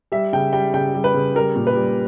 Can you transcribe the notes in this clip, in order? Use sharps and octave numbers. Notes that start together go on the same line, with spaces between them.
G3 E5
C#3 G5
G3 G5
C#3 G5
G3
B4
C#3
G3 A#4
A#2
B4
G3